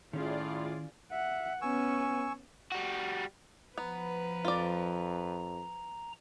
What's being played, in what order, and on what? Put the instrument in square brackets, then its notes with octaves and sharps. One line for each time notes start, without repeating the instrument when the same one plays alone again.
[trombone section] A2 [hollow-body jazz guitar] D#3 C#4 E4 [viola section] F4 G#4 D5
[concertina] E5 [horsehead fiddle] F#5
[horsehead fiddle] B3 C#4 [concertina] G#5 C#6 E6
[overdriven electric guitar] G3 F#4
[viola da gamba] F3 B4 [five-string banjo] B3 [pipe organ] A#5
[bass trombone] F2 [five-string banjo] F4 D5